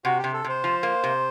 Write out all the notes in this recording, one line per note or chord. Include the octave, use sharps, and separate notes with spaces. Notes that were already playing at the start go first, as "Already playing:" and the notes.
C3 F#4
G4
C3
A4
C3 C5
F3
A#3
C3